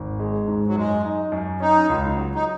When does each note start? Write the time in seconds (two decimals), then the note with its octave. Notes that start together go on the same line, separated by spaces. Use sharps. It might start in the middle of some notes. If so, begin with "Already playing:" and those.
Already playing: G#1
0.20 G#3
0.48 G#2
0.67 F#3
0.76 F#2 G#3
1.05 D#4
1.32 F#2
1.60 C#4 D#4
1.90 C#2
2.17 F#3
2.35 D#4